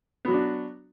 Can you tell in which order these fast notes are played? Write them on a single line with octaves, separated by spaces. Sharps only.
B3 F#3 F#4 D4